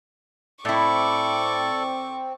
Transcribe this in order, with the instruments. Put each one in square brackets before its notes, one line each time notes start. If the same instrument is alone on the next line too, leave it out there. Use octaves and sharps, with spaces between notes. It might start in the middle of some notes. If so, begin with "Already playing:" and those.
[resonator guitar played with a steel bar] A2 E4 [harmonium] C4 [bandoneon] A4 D5 [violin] C#6 D6